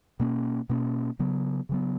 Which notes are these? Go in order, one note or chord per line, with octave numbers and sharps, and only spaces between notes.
B2 A#3 C#4
B2 A#3 C#4
C#3 F#3 B3
C#3 F#3 B3